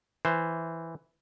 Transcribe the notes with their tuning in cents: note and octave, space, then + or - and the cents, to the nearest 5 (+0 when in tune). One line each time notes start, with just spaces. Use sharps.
E3 +0 C5 +0